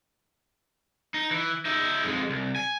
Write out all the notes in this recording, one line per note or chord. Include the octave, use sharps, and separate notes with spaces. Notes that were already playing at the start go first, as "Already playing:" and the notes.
D#4
E3
D#4 E5
F2 G#3
C2
G#5